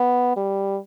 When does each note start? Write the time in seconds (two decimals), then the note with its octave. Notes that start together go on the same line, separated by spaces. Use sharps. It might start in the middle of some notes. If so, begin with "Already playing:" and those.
Already playing: B3
0.37 G3